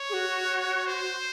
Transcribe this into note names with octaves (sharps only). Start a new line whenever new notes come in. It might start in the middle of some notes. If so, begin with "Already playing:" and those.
Already playing: C#5
G#4
F#4
C5